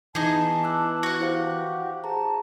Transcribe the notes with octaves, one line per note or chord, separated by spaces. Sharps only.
E3 B3 D#4 G#4 A5
D6 E6 F#6
F#4 F#5
E4 G4 C5 F5
G#4 A5 A#5